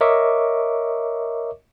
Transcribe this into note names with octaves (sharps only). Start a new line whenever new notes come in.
A#4 C#5 D#5 E5 C#6 D6